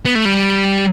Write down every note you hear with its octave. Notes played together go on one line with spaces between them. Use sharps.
B3
A3
G3